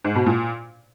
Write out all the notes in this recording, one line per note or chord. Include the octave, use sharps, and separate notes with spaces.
G#2
B2
A#2